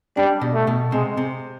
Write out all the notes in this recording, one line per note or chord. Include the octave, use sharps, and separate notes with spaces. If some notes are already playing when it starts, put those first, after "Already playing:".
G3 D4
B2
A3
B2
C3 G#3
C3